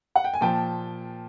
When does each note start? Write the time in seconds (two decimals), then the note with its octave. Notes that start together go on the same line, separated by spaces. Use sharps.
0.16 F#5
0.24 G5
0.34 G#5
0.41 A#2 F3 G5 A5